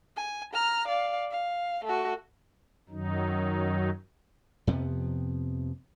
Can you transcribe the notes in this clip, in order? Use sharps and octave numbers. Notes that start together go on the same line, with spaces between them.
G#5
A#5 F6
D5 F5
F5
A3 F#4
F#2 D#3 F#3 D#4
F2 C3 F3 B3